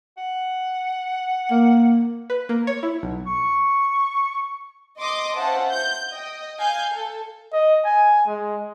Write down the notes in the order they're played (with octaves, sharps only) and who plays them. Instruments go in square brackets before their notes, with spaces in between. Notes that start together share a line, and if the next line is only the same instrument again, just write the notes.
[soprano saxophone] F#5
[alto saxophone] A#3
[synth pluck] B4
A#3
C#5
E4
B1
[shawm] C#6
[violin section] D#5 C6 D6 D#6
C#4 F4 C5 E5 F#5 A5
G6
D#5 G5
F5 G#5 G6
A4 A5
[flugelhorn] D#5
G#5
G#3